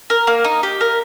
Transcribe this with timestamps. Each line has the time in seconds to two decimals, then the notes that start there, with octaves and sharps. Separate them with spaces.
0.10 A#4
0.27 A#3
0.44 D#4
0.63 G4
0.81 A#4